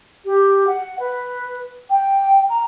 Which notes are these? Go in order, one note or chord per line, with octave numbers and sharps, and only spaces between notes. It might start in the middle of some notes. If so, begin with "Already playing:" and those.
G4
F#5
B4
G5
A#5